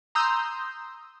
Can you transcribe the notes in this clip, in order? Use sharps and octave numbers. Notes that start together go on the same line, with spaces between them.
A#5 C6 D#6 E6 G6